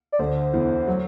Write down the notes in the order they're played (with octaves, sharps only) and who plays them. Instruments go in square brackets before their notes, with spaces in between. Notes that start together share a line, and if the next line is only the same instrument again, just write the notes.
[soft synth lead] D5
[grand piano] D2 D3 [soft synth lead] C5
[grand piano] E2 E3
F#3